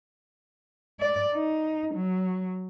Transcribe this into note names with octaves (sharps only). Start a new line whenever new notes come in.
D5
D#4
F#3